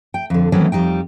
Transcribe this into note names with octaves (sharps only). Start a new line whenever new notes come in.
G5
F2 D3
D#3 E3 F#3 A3 C4 C#4
F2 G3 D#4 G5